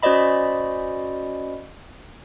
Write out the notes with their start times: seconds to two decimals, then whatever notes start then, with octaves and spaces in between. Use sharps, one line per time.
0.03 C#4 F#4 C5 D5 D#5 B5